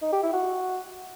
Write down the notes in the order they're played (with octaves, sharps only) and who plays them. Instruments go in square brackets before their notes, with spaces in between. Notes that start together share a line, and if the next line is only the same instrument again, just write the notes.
[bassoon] D#4
G4
E4
F#4